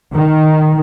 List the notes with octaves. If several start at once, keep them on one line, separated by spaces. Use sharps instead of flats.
D#3